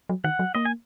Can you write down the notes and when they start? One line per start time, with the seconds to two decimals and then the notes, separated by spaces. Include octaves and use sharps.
0.09 F#3
0.24 D#3 F#5
0.39 F#3
0.55 A#3 D#5
0.65 G#5